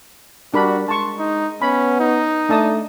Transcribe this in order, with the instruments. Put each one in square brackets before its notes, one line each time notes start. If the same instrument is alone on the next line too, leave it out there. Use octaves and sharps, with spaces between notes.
[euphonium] G3 [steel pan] D4 A#4 B5 [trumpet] F#4
[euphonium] G#3 [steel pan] A5 C#6 [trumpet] C6
[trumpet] D#4
[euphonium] B3 [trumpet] C#4 [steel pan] B5
[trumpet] D#4
[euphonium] A3 [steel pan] D4 A5 D#6